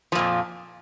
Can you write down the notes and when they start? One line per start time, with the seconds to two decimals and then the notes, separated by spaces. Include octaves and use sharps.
0.12 F3
0.15 A#2
0.19 F2